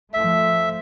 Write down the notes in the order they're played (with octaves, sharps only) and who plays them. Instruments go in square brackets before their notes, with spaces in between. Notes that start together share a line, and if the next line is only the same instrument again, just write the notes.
[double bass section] F3 A3 [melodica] E5